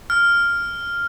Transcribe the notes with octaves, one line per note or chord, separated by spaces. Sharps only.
F6